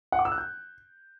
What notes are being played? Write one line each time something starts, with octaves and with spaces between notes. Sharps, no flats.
F#5
D6
E6
F#6
G6